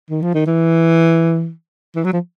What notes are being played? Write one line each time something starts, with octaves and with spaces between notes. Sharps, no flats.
D#3
F3
D#3
E3
E3
F#3
F3